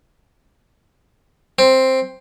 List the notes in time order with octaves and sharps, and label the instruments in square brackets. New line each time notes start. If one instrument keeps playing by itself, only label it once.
[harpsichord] C4